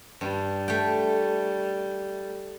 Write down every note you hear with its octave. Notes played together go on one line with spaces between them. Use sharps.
G2 G3
A3 G5